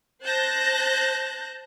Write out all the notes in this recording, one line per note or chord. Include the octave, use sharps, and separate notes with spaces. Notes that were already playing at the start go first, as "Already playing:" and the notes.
C5 A5 F#6 G6 A#6